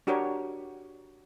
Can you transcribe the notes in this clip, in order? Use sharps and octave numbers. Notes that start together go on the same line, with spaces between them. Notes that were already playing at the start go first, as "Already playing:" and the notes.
D4 F#4 G4 A#4 C#5